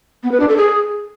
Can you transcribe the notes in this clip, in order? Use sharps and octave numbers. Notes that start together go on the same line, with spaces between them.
B3
B4
D4
A4
G#4